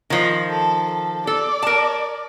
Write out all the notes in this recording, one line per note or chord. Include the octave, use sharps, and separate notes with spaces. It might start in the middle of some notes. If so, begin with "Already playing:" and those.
D#3 F3
A4
A4
A4 D5
A#4 A5